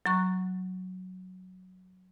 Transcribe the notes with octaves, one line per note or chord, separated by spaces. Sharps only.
F#3 A#5 C#6 F#6